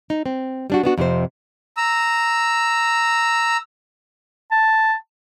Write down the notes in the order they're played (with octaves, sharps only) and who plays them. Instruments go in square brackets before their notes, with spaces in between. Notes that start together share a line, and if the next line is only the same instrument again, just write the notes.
[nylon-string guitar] D#4
C4
G3 D4 F#4
B3 D4 F#4
F2 C3 F#4 C5
[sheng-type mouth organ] A#5 E6
[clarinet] A5